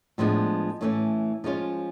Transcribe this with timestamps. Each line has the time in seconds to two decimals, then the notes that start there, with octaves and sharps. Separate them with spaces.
0.18 A2 F3 G#3 B3 D4
0.81 A2 E3 A3 C#4
1.44 F3 G#3 C#4 F4